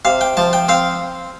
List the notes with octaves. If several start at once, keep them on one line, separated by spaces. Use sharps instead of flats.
C3 F5
G5
F3 A5
G5
C4 F5